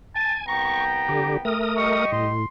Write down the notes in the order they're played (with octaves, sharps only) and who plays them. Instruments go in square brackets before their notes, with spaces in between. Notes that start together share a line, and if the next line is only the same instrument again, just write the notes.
[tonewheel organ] G#5 [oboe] A5
[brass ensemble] C2 B3 G5 [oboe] A#5 [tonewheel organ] C#6
[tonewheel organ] D3 G4
A3 A#4 D#6
[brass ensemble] G3 G4 D#5 [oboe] C#6
[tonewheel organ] A2 [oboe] C6